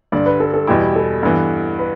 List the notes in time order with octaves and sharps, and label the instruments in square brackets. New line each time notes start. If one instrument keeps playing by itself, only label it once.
[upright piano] G2 D3 G3 [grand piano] D5
[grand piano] B4
A4
A4
[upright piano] E2 B2 G3 E4 [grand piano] G4
[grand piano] A4
[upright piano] G2 E3 B3
[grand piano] B4